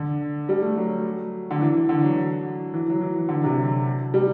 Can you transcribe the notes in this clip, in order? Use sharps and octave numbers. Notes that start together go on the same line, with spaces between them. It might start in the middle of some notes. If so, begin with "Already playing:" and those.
Already playing: D3
G3
A3
F#3
D3
E3
D3
F#3
E3
F#3
E3
D3
C3
F#3
G3